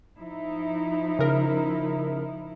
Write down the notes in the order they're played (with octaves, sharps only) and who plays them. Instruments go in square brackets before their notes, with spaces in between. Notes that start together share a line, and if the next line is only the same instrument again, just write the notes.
[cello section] F3 D#4 E4
[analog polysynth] C#3 A#4